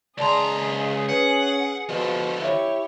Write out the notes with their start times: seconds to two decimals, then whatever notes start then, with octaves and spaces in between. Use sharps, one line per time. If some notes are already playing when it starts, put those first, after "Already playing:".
0.18 C#2 G#4 D5 A5 A#5 C6
1.09 C#4 B4 F#5
1.89 B2 D3 F3
2.41 E4 G4 C#5